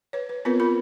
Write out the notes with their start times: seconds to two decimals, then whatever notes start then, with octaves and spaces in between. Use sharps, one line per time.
0.13 B4 C#5
0.29 B4
0.45 B3 C4 F4 A#4 B4
0.60 F4 A#4 B5